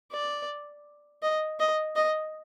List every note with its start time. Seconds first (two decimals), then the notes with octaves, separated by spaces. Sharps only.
0.12 D5
1.23 D#5
1.60 D#5
1.96 D#5